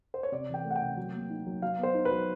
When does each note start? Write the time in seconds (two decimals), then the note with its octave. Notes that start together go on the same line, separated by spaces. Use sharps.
0.14 C5
0.23 C#5
0.32 C3 D5
0.49 E3 G5
0.65 A3
0.71 F#5
0.76 G5
0.82 C3
0.97 F#3
1.14 A#3
1.30 D#4
1.47 F#3
1.62 F#3 F5
1.79 B3 C5
1.94 D#4
2.05 B4
2.11 F#3